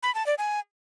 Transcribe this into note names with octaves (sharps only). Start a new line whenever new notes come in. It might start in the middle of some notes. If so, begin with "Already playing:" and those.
B5
A5
D5
G#5